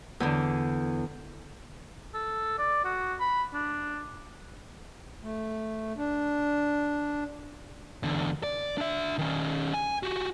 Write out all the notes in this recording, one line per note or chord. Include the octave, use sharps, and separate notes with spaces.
E2 D3
A4
D5
F#4
B5
D4
A3
D4
E2 D3
D5
D4 E5
D#3 C#4
G#5
F#4 G4